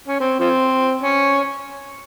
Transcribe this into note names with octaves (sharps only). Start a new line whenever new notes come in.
C#4
C4
F3 C4
C#4